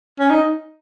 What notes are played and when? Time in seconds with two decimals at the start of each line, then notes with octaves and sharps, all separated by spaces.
0.19 C#4
0.30 D#4